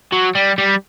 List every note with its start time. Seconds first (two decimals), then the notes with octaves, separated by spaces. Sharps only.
0.12 F#3
0.35 G3
0.58 G3